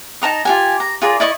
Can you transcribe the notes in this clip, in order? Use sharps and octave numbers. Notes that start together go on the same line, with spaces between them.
D#4 A5 A#5 D#6
F4 G4 G#5
A#5
F4 G#4 A#4 D5
E4 D5 D#5 C#6